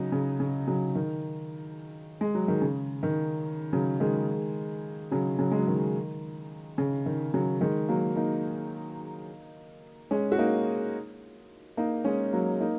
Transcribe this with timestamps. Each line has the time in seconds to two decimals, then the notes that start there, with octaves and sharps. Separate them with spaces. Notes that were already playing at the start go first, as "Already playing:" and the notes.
Already playing: C#3 F#3 D#4
0.12 C#3
0.40 C#3
0.67 C#3 F#3
0.95 D#3
2.21 G#3
2.35 F#3
2.48 D#3
2.62 C#3
3.03 D#3
3.73 C#3 F#3
4.00 D#3 G#3
5.11 C#3 F#3
5.39 C#3 F#3
5.51 G#3
5.59 F#3
5.68 D#3
6.78 C#3
7.06 D#3
7.34 C#3 F#3
7.61 D#3 G#3
7.89 F#3 A#3
8.16 A#3 D#4
10.11 G#3 C#4
10.32 F#4
10.38 A#3 D#4
11.77 A#3 D#4
12.05 G#3 C#4
12.33 F#3 A#3
12.60 A#3 D#4